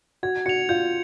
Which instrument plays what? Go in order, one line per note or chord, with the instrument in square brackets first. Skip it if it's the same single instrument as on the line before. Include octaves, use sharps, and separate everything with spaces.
[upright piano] F#4 [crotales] G#6
[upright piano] F#4 [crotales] C#7 F7
[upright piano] F4 [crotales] G6